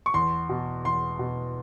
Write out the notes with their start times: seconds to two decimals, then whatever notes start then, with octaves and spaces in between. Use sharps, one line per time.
0.06 C#6
0.14 E2 C6
0.49 B2
0.85 E2 C6
1.19 B2